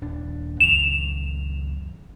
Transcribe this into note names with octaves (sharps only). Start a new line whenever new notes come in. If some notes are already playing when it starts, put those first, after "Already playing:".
D#1 D4
C#2 F#2 D#3 E7 F7